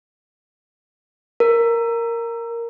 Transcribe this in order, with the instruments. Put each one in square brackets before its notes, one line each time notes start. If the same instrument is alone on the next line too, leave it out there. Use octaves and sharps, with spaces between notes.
[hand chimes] A#4